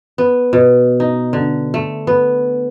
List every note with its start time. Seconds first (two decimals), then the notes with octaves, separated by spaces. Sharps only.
0.18 B3
0.53 B2
1.00 D#4
1.33 D3
1.74 A3
2.07 B3